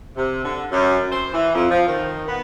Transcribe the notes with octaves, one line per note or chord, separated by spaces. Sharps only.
C3
D3
F#2
C5
E3
F2
F3
D#3
B3